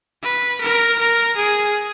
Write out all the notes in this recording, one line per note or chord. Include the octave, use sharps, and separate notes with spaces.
B4
A#4
A#4
G#4